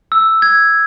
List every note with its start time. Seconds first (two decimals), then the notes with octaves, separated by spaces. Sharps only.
0.12 E6
0.42 G#6